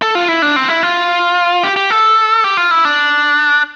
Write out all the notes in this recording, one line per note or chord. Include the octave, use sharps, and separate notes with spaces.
A4
F4
E4
D4
C4
E4
F4
G4
G4
A4
G4
F4
E4
D4